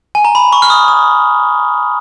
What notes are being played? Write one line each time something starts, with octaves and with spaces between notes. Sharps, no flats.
G#5
A#5
B5
C#6
F6
D#6
D#6